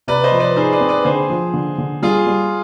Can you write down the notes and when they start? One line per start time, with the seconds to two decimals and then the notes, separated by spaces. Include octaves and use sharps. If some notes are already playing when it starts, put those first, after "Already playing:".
0.08 C3 B4 D5
0.24 C5 D#5
0.32 F3
0.40 B4 D5
0.56 D#4 G#4 C5
0.72 B4 D5
0.80 C4
0.89 B4 D5
1.05 D3 G#4 C5
1.30 F3
1.54 D3
1.78 D3
2.02 G3 F4 G#4
2.27 G3